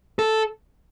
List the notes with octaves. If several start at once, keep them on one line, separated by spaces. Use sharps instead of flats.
A4